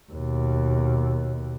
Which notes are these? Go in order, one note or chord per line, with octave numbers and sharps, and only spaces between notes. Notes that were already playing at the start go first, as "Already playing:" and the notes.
D#2 B2